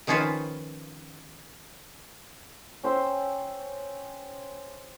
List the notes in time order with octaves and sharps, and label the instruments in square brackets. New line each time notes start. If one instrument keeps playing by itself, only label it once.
[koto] D#3 F3 C#4 F4 B4 C5
[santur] C#4 C5 G5 E6